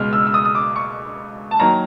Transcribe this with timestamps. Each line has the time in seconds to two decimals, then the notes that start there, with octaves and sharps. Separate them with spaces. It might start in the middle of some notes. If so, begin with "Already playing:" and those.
Already playing: C#2 B2 G#3 F6
0.13 E6
0.27 E6
0.34 D#6
0.45 D#6
0.55 D6
0.76 C#6
1.51 A5
1.59 D#3 F#3 A#3 A#5